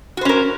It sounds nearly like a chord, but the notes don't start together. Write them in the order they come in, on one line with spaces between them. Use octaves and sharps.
F#4 C5 C#4 A#4